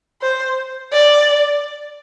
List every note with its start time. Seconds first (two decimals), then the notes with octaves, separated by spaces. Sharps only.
0.22 C5
0.93 D5